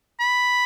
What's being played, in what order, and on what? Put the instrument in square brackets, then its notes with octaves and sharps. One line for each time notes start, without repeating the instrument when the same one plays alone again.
[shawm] B5